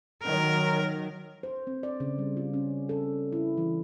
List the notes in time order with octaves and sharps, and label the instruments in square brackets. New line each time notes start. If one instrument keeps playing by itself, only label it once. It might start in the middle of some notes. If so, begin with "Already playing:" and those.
[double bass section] D#3 F#3 [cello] A#4
[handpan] C5
C4
D5
C#3
G3
F4
C#4
A4
E4
E3